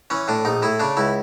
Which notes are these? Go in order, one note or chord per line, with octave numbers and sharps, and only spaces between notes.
E3 C#4
A2 D4
A#1 D#4
A2 E4
C#3 D4
C#2 E4